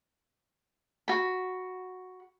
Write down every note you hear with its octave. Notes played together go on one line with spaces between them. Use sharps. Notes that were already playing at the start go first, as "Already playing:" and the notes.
F#4 B5